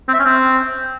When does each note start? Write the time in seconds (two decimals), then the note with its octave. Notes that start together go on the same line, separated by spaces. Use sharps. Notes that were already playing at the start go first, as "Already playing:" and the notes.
0.08 C4
0.14 E5
0.19 C#4
0.25 C4